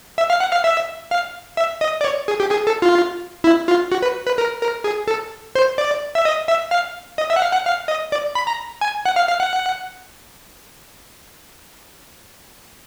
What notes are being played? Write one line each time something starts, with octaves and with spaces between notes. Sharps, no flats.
E5
F5
F#5
F5
E5
F5
E5
D#5
D5
C#5
G#4
G4
G#4
A4
F4
E4
F4
F#4
B4
B4
A#4
A#4
G#4
A4
C5
D5
E5
D#5
E5
F5
D#5
E5
F#5
F5
F#5
F5
D#5
D5
B5
A#5
G#5
F#5
F5
F5
F#5